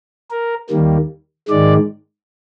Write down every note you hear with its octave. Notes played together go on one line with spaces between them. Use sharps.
A#4
D#2 D#3 G3 A#3
G#2 D#3 G#3 D5